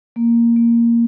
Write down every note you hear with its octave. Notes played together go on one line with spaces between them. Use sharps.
A#3
A#3